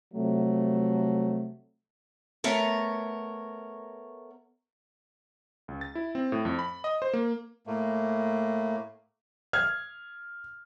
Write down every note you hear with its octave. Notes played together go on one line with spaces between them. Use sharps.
C3 F3 F#3 A3
A3 B3 A#4 C#5
C#2
A6
E4
C4
A2
F2
B5
D#5
C5
A#3
A2 A3 A#3
F6 G#6